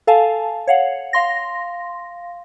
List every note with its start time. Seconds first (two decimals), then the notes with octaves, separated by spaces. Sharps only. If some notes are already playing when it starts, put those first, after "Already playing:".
0.07 A4 F5 G#5 A5
0.67 C#5 F5 F#5
1.13 F5 C6 A#6